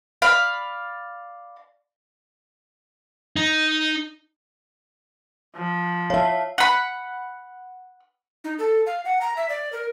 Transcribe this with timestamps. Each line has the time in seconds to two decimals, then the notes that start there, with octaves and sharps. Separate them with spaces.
0.22 D5 F5 B5
3.36 D#4
5.56 F3
6.10 C#5 E5 F5 A5
6.58 F#5 B5
8.44 D#4
8.59 A4
8.86 F5
9.05 F#5
9.21 A#5
9.37 E5
9.49 D5
9.73 A#4